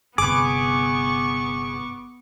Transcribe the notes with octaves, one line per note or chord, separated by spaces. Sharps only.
G1 C3 B3 G#4 B4 C#6 D6